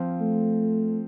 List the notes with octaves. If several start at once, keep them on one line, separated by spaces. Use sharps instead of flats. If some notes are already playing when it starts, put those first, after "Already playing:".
Already playing: F3 C4 F4
A3